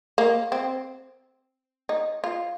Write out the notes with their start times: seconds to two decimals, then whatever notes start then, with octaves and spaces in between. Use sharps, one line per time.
0.18 A#3
0.52 C4
1.89 D#4
2.24 F4